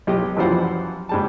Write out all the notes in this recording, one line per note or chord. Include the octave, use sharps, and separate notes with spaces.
B1 G4 D#5
F#2 E3 F3 G3 C5 F#5
G#2 G3 A5